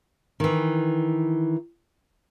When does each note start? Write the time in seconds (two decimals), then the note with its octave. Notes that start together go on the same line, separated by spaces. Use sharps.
0.40 D#3 E3